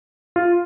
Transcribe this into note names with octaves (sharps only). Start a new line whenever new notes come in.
F4